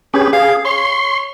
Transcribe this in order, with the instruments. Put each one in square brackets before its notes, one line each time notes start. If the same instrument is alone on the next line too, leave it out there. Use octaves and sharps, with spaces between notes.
[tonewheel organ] C#4 G4 G#4 [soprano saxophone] B4
[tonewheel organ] G#4 [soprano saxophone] F5
[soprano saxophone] C#5 [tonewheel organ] C6